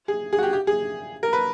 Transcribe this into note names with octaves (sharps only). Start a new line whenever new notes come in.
G#4
G#4
F#4
G4
G4
G#4
A#4
B4